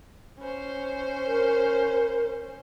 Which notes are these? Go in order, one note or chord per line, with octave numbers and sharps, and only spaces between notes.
C#4 C5
A#4